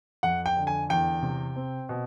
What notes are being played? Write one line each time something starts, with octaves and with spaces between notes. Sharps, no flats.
F2 F#5
G5
D3
G#5
E2 G5
C3
C4
B2